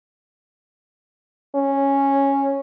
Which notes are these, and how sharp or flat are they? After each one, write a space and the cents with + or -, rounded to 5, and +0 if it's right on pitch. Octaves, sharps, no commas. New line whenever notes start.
C#4 -5